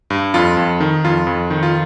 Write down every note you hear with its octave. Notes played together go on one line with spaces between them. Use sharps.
G2
F2 F4
F2
D#3
F2 F4
F2
D#3
F4